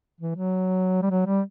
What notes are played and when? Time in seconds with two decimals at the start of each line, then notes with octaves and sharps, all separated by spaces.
0.21 E3
0.36 F#3
1.02 G3
1.10 F#3
1.26 G3